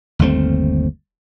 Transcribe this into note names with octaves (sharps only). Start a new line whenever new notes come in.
G1 D#2 A3 C4